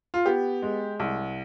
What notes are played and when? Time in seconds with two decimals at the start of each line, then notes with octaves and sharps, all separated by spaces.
0.14 F4
0.25 B3 G4
0.62 G#3
1.00 C2